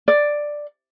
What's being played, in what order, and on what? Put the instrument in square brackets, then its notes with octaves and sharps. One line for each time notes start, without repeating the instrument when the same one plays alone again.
[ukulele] D5